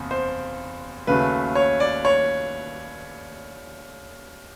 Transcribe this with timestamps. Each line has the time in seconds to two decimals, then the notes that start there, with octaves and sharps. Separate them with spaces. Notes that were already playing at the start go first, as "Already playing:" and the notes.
Already playing: F#1 E2 C3
0.11 C5
1.07 D#2 C#3 F#3 A3 B4
1.55 C#5
1.80 D5
2.05 C#5